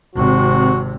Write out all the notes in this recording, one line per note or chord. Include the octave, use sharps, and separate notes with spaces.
G#1 C3 F#4